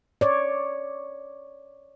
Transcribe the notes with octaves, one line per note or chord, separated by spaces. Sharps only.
C#5 D5